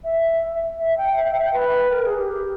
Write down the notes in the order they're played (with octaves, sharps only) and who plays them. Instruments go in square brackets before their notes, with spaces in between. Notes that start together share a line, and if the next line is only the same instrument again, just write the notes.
[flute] E5
E5
G5
E5
G5
E5
G5
B4
A#4
G#4
G4